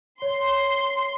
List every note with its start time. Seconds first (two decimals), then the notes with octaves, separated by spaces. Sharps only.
0.22 C#5 C6